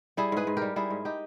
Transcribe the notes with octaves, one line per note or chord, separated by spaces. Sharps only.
G3 E4 G#4
G#2 G#4 B4
G#2
G3 G4 A#4
G3 E4 G#4
G#2
D#4 G4